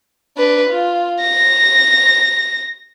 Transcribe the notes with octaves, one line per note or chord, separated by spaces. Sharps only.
D4 B4
F4
A#6